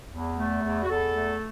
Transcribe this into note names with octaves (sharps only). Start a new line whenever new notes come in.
E2
A3
E2
F#4
E2 A4
A3